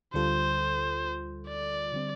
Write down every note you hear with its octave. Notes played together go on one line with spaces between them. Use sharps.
D2 D3 G3 F4 A4 C5
D5
D3 G3 C4